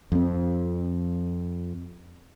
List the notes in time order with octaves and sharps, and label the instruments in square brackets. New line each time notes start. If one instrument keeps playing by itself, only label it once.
[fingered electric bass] F2 C4